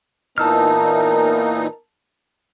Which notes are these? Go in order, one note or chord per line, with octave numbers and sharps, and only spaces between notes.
A#2 E3 B3 D#4 A#4 A5 E6 F6